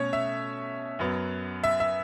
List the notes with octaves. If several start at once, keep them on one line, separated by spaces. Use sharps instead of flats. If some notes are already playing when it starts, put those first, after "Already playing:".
Already playing: B2 A3 C#4 C#5
E5
F#2 F#3 B3
E5
E5